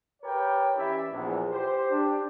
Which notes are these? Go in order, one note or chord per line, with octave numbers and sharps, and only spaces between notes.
G4 A#4 B4 C#5 D5 G5
E3 C#4 E4 G4 D5 E5
A#1 E2
G4 C5
D4 G4